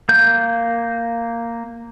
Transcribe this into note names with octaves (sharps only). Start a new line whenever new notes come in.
A#3 G6